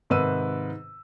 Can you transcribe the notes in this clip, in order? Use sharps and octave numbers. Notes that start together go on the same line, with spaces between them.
G#2 C3 D#3 B4 E6 D#7